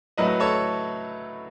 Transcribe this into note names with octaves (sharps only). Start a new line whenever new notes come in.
A2 F#3 A3 B4 D#5
A4 C#5